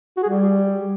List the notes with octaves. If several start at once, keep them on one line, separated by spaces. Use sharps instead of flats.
F#4
G#4
G3